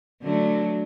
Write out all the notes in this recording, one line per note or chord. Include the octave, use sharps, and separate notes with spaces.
D3 F#3 A3